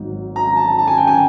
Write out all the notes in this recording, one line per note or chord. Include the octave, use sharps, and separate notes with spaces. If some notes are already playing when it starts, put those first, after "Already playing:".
Already playing: G#1 G#2 D#3 F#3
A#5
A5
A5
G#5
G5
G#5